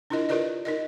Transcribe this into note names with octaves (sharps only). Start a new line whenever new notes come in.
D4 E4 F4 A#4 D#5
F4 G4 A#4 B4 D5 D#5
D#4 A#4 D#5